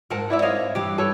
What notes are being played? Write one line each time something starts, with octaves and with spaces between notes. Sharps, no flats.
G#2 C4 A#4 F#5 A5
E4 D5 E5
C#5 D#5 F5
G2 E3 G4
A4 B4 C#5